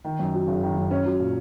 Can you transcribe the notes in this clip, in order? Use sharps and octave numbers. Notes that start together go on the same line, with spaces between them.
D#3
F#2
F#3
F#1
D#3
F#2
C#4
F#3
A#2